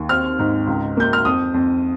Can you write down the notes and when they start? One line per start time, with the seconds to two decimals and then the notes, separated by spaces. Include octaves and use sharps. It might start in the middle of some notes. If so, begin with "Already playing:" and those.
Already playing: D#2
0.09 C4 F6
0.39 G#2
0.67 C#2
0.97 A#3 G6
1.13 F6
1.25 F2 D#6
1.54 F2